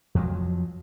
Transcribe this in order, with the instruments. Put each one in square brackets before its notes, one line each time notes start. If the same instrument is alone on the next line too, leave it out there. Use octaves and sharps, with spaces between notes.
[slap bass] F2 F3 F#3